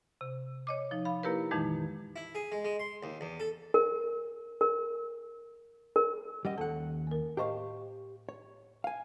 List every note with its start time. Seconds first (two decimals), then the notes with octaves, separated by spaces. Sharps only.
0.21 C3
0.67 C#5 D#5 D6
0.91 F3 D#4
1.05 F5 B5
1.23 A#3 E4 G4 A#4 B4
1.51 F2 A#2 D#3 E3 G#3 D#4
2.16 E4
2.35 G#4
2.52 G#3
2.65 G#3
2.79 C6
3.03 D#2
3.21 E2
3.40 A4
3.74 A#4
4.61 A#4
5.96 A#4
6.45 G3 C#4 D#5 F#5
6.58 D#2 A4 F#5 A5
7.07 A#3 A#4
7.37 A2 G4 C5 D#5 F5 C#6
8.29 C#5
8.84 F5 G#5